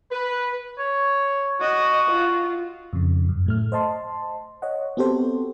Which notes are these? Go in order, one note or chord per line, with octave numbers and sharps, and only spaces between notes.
B4
C#5
F#4 D#5
F4
F2 C#3
F#2
A2 A3 F6
C5 D#5 A5 C6
C#5 D#5 F#5
B3 C4 F#4 G4 A4 C5